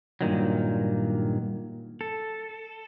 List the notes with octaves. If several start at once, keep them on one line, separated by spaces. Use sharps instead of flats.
G2 A#2 D#3 F#3
A4